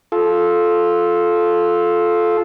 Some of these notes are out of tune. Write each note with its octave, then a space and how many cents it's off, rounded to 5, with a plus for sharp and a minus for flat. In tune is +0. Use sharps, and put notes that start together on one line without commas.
F4 +0 A4 -15